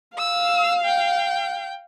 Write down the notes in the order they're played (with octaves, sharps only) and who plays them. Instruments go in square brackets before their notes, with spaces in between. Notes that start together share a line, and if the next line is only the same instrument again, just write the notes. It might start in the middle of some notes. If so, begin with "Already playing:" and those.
[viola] F5 [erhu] E6
[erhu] G5